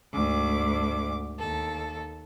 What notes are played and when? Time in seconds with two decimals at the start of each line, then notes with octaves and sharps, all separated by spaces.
0.12 D2 G#2 D6
1.38 D#2 A4